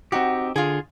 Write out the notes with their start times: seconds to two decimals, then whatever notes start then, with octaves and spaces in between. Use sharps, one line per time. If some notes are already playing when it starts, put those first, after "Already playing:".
0.12 C4 D#4 F#4 G4
0.56 D3 F4 G#4